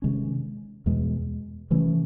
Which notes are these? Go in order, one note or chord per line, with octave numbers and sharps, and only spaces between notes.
C3 D#3 G#3 C#4
E2 B2 G#3
C3 E3 A3 C#4